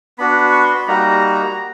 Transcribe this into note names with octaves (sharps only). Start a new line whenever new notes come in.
B3 D4 F#4 B5
C#6
C6
B5
G3 A#3 D#4 F#4 A#5